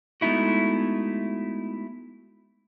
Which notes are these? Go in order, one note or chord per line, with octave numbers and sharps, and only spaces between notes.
G#3 A3 B3 D#4 E4 F#4